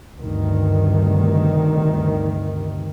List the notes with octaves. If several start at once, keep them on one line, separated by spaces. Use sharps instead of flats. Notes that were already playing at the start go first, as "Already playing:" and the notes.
D2 G2 C3 D#3